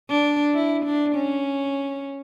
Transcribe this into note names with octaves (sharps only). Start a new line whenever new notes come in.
D4
E4
D4
C#4